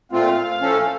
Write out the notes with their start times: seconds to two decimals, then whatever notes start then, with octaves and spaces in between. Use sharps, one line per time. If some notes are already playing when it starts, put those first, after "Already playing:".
0.12 A#2 A3 C4 F4 F5
0.61 A2 F3 A3 C#4 A4